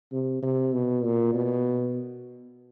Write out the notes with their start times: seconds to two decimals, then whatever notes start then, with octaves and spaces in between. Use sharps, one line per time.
0.12 C3
0.42 C3
0.73 B2
1.04 A#2
1.34 B2